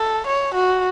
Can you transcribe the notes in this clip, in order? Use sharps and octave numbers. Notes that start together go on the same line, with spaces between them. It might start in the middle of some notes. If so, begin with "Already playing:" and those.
Already playing: A4
C#5
F#4